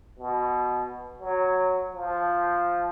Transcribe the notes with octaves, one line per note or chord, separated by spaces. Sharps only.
B2
F#3
F3